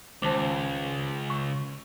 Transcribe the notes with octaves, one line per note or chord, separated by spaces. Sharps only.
C#2 D#3 C5 A5
C#6